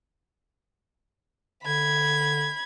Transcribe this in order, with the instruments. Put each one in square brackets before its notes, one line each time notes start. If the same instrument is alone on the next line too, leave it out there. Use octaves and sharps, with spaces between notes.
[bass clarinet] D3 [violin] B5 G#6